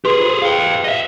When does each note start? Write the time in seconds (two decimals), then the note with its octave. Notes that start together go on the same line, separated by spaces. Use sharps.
0.05 G4 G#4 B4 C6
0.20 F4 C5
0.42 F5 G5
0.84 D#5 E5